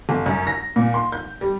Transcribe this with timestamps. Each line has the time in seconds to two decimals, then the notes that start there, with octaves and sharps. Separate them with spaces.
0.09 G1
0.26 F#2
0.47 A#6
0.76 A#2
0.94 C6
1.12 G6
1.41 G3